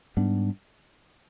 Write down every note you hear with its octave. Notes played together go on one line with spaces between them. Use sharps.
G#2 G3 B3 D4